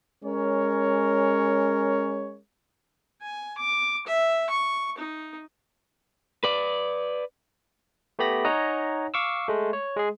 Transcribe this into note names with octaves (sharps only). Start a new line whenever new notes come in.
G#3 C#4 A#4 C#5
G#5
D6
E5
C#6
D#4
B4 D5
A3 B3 G4 B5 A#6
D#4 C#5 D#5 F#5 G#5 A#5
F5 C#6 D6 E6
G#3 A3
C#5
G#3 G#4